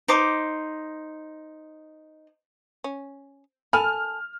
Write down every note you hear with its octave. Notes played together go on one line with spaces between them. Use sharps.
D#4 C5 D6
C#4
A4 G#5 A5 B5 F6